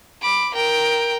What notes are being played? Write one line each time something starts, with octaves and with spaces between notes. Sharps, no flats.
B5 D6
A#4 G5